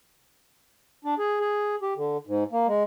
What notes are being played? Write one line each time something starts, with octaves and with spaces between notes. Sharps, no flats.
D4
G#4
G#4
G4
D3
G#2
A#3
G#3